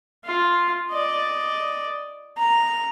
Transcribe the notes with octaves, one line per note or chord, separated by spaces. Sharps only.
F4
D5 D#5
A#5